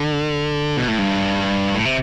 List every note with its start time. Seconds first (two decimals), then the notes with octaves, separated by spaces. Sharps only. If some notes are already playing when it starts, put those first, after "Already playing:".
Already playing: D3
0.77 B2
0.88 A2
0.99 G2
1.74 A2
1.85 C3